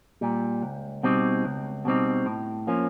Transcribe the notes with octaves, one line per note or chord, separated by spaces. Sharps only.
A#2 G3
C#2
B2 G3 C4 D#4
C#2
B2 G3 C4 D#4
A2
F3 A#3 C#4